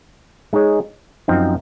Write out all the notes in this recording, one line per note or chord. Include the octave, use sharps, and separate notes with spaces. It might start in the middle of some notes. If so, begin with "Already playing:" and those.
G#3 D#4 G#4 C#5
F#2 F3 C4 D#4